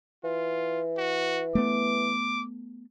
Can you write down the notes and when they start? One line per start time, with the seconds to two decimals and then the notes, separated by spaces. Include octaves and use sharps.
0.24 E3 F4
0.98 F#4
1.55 A3 B3 D6